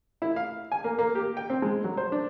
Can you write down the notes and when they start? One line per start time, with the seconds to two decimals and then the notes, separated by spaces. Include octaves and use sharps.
0.22 E4
0.36 F5
0.72 G#5
0.84 A#3
0.99 A#3
1.15 G4
1.37 G5
1.50 C4
1.62 G#3
1.84 F#3
1.97 C5
2.12 D4